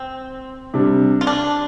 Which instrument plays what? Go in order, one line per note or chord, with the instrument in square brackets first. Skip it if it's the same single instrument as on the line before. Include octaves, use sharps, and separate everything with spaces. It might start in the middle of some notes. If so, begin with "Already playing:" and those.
Already playing: [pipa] C4
[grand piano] C3 G3 D4
[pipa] F4
D4